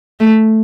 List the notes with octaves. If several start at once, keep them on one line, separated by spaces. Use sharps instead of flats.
A3